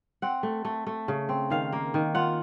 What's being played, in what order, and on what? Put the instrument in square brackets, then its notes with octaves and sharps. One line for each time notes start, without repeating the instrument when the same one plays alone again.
[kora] C4 F#5
A3
A3
A3
C#3
C4
D#3 F5
A#3
D#3
F4 F#5